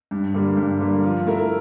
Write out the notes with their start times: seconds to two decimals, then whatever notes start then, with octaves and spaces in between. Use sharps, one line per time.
0.11 G2
0.34 D3 G3 A#3
0.57 G2
0.80 D3 G3 A#3
1.03 F3
1.26 A3 E4 A#4